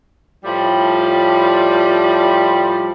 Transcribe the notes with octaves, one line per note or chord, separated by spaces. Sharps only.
A2 F3 G3